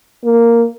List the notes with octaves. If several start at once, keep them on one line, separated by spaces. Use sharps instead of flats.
A#3